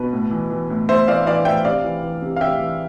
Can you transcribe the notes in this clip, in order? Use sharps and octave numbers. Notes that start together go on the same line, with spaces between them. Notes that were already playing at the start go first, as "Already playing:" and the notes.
Already playing: B2 B4
A2
E3
E3
A2
A2 C5 E5
E3 D5 F5
E3 D5 F5
A2 E5 G5
C3 D5 F5
E3
E3
C3
F5
C3 E5 G5
E3